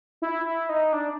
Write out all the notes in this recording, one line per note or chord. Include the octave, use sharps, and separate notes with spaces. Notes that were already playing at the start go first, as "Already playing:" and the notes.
E4
E4
D#4
D4